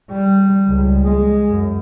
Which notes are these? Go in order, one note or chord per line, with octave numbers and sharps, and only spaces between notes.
G3
C#2 G3
G#3
F#2